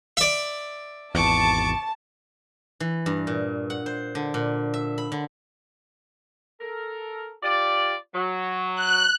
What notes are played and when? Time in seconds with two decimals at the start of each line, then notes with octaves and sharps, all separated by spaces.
0.17 D5 E5
1.15 G#1 E2 A5 C#6 D6
2.80 E3
3.06 G2
3.27 A#2
3.70 F#5
3.86 C5
4.15 D3
4.34 A#2
4.74 E5
4.98 B5
5.12 D3
6.60 A4 A#4
7.43 F4 G4 D5
8.15 F#3
8.75 F#6